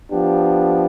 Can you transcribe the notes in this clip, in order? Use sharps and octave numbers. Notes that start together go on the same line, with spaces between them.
F3 B3 D4 G4